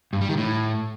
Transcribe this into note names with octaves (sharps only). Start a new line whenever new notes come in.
G2
G3
D#3
A2